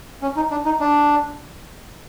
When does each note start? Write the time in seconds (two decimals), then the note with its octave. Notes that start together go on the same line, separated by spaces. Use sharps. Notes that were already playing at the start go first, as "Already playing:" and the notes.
0.22 C#4
0.36 D#4
0.51 D4
0.65 D#4
0.80 D4